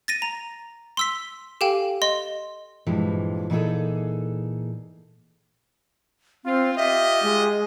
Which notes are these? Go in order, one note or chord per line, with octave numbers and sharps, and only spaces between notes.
A6 A#6 D#7
A#5
C6 E6 B6
G4 A4 F5 G5 G#5
D#5 C6
G2 A#2 E3 F3 G#3
A#2 E3 D#4 F#4 G#4 A4
C4 F4
F4 G4 D#5 E5
G#3